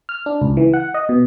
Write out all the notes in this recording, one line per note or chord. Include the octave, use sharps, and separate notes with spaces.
F6
D4
C#2
E3
F#5
D#5
B2